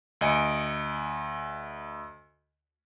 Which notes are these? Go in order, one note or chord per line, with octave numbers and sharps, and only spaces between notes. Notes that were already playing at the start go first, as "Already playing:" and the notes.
D2 D#5 G#5 C#7 D7